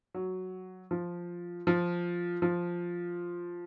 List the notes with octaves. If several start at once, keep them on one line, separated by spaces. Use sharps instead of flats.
F#3
F3
F3
F3